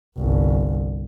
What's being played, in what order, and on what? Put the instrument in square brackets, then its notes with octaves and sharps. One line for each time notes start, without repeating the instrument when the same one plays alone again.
[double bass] G1 C2